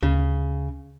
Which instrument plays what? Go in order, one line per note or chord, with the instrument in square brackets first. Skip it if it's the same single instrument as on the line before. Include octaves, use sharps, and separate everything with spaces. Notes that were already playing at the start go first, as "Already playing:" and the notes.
[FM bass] D2 [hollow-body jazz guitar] C#3